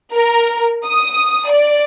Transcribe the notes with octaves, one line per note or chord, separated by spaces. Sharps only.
A#4
D#6
D5